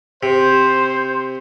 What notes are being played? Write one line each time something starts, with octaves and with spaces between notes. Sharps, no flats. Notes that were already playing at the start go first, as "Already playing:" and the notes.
C3 C5